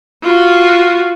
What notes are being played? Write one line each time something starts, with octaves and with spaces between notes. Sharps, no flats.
F4 F#4